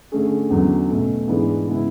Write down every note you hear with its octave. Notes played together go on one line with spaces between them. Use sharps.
D3 A3 C#4 G#4
E2 D3 F#3 C#4
B2 A3 C#4
G#2 E3 B3 D4 G#4
C#3 G#3 B3 E4